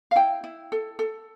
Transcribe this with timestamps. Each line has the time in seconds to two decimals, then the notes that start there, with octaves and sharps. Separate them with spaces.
0.11 F5
0.16 E4 G5
0.44 E4
0.72 A4
0.99 A4